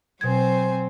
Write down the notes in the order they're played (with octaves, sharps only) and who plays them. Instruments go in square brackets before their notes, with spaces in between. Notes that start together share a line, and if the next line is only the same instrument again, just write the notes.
[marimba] B2 G#6 [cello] F#3 C4 [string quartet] C5 G#5